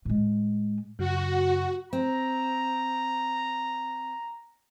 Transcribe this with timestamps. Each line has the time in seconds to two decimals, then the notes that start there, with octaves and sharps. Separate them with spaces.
0.05 A2 G#3
0.99 F#2 C#3 F#4
1.93 C4 A#5